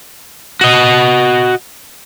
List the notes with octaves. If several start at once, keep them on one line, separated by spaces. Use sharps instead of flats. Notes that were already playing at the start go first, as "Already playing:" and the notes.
F#4 D#5